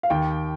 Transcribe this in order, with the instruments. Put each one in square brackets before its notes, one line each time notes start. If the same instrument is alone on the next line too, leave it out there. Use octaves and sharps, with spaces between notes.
[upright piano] F5
[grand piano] D#2 [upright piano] G5